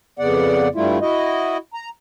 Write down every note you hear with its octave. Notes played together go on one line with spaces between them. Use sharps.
F2 C#3 B3 D5 F#5
G2 G3 A3 E4 F4
E4 F#4 D#5
A#5